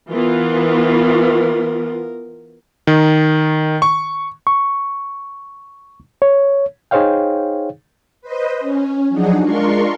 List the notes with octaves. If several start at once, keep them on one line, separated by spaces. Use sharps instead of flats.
E3 B3 F4 A#4
D#3
C#6
C#6
C#5
D#4 G#4 C5 C#5 F5 G5
B4 C5 D#5
C#4
F3 F#3 D4 D#4 F#4 G#4
G#3 D4 F4 A#4 C6 C#6